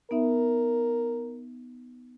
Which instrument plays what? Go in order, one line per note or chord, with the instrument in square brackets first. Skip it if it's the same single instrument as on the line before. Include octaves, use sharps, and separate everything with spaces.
[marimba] B3 D#4 E5 [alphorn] A#4